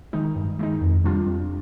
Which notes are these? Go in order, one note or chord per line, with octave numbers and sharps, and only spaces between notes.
D#3 G#3 D#4
G2
D#3 G#3 D#4
F2
C3 G3 D4 F4
F2